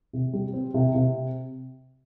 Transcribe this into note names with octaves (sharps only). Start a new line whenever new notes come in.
C3
G3
C4
C3
C3